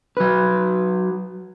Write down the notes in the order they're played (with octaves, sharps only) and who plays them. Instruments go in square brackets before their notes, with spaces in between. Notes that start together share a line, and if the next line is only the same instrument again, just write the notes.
[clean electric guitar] F#3 B4